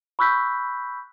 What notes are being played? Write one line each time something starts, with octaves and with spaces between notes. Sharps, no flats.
B5 C#6 E6 F#6 G6 B6